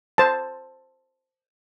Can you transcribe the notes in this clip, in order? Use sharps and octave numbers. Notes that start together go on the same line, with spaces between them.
C5 A5